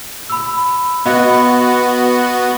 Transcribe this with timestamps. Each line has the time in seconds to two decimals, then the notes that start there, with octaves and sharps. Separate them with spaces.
0.30 B5 E6
1.06 B3 F#4 D#5 F5 B5